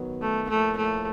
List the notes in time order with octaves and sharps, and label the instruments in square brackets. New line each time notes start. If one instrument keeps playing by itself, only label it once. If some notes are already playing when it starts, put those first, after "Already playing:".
Already playing: [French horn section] D#3 F#3 B3
[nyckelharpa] A3
[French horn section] A2 F3 A#3 [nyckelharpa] A3
[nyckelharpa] A3